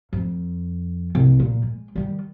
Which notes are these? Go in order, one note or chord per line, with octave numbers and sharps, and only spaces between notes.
F2
C2
A#2
G#3
D#3 G3